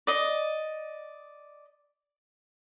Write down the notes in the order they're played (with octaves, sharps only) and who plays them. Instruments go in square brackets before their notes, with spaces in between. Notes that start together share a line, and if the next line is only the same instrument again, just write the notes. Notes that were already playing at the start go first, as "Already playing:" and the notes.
[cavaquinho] D5 D#5